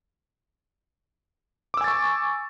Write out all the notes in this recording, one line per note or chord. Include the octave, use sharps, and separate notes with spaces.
G#5 C#6 D6 E6 A6